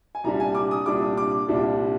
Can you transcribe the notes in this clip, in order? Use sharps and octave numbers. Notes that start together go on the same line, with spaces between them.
G#5
C2 A#2 G3 D4 A#5
G#5
D6
D#6
C2 A#2 G3 D4 D6
D6
C2 A#2 G3 D4